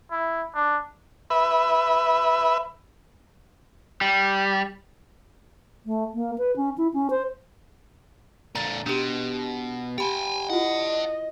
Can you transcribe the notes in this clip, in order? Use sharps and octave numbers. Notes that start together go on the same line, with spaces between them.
E4
D4
B4 E5
G3
A3
A#3
B4
C#4
E4
C#4
C5
A#2 D3 A#5 A6
B2 D4 G4
G4 G5 G#5 B5
E4 F4 D5 D#5 F#5